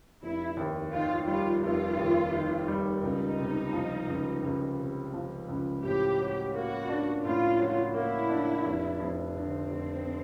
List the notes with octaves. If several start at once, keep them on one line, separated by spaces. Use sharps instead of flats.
F1 E4
D#2
D#3 F4
G3 F4
F1 F4
D#2
D#3
G3
C#2 D#4
C3
F3
C#2
C#2
C3
F3
C#2
A2 G4
F#3
A#3 F#4
D4
A2 F4
F#3
A#3 E4
D4
F1
F2
D3 C4
F1